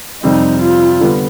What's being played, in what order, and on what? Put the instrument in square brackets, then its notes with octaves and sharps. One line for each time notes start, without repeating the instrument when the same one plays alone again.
[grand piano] F2 C3 G3 C4 [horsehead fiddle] D#4
[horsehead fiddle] F4
[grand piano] D3 G3 B3